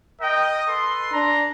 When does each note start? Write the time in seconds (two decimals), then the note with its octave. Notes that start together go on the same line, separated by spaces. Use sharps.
0.21 A#4 D#5 G5
0.68 A4 B4 C6
1.13 D4 A#5